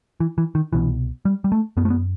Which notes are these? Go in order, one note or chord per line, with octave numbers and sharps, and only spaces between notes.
E3
E3
D#3
C2 B2 E3
G3
G3
A3
F#2 B3
A3
B3